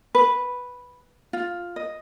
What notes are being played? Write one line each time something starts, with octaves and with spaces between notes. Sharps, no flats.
B4
F4
D#5